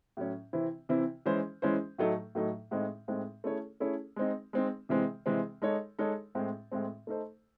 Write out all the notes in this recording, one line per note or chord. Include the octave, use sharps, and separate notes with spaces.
A2 F#3 C#4
C3 E3 C4 E4
C3 E3 C4 E4
E3 G#3 C#4 E4 C5
E3 G#3 C#4 E4 C5
A2 F#3 A3 D#4
A2 F#3 A3 D#4
A2 G#3 C4 D#4
A2 G#3 C4 D#4
A3 C#4 E4 G#4 C#5
A3 C#4 E4 G#4 C#5
G#3 C4 D#4
G#3 C4 D#4
C3 E3 G#3 C4
C3 E3 G#3 C4
G#3 D#4 A4 C#5
G#3 D#4 A4 C#5
A2 G#3 C4
A2 G#3 C4
A3 D#4 A4 C5